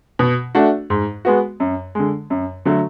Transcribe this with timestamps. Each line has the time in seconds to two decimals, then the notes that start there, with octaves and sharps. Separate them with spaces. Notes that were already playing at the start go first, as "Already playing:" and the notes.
0.19 B2
0.55 A3 D4 F#4
0.90 G#2
1.25 G#3 B3 F#4
1.60 F#2
1.95 D3 G#3
2.30 F#2
2.65 D3 F#3 A3